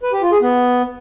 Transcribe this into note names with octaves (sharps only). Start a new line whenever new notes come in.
B4
G4
F4
G#4
B3